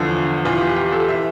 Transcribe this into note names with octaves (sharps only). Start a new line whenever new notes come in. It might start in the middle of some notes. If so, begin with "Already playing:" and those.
Already playing: E2 D3 F3
E2 E3 F4
G4
G4
F4
A4
E3 E5